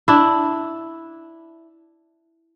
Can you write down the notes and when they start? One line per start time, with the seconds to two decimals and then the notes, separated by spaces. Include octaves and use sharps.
0.08 D4 E4